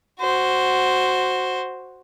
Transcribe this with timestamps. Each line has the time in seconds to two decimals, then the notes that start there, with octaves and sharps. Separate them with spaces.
0.21 F#4 C5